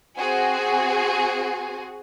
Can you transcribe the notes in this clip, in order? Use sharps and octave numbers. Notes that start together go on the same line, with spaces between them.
C4 F#4 G#4 G#5